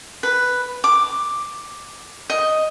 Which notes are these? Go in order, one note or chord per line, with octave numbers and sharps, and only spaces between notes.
B4
D6
D#5